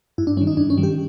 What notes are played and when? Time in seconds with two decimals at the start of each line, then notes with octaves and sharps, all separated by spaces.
0.18 G2 E4
0.27 D4
0.37 G3 C#4
0.41 D#3
0.47 D#4
0.57 G2 D4
0.70 C#4
0.77 D#3 G3
0.83 G4